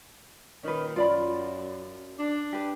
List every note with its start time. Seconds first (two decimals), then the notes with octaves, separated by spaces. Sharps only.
0.63 A#2 D#3 C#4 B4
0.96 F#2 F4 D5 B5
2.19 D4
2.53 G4 B4